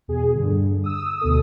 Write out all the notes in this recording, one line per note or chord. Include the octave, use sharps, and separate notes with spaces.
E2 B2 G#4
G2 D3
D#6 E6
D2 B2 A4 D#6